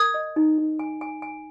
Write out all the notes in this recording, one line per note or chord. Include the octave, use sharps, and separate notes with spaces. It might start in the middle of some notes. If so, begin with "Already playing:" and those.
Already playing: A#4 D#6 G#6
D#5
D#4
D#4
G#5
G#5
G#5